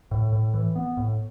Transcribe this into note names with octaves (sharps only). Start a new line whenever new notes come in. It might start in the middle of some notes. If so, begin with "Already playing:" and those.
A2
A2
E3
B3
A2